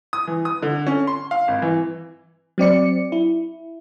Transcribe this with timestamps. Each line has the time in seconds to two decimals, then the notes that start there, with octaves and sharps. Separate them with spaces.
0.13 D#6
0.27 E3
0.45 D#6
0.62 D3
0.87 C#4
1.07 C6
1.31 F5
1.48 G#1
1.62 E3
2.58 F#3 C4 D5 C#7
3.12 E4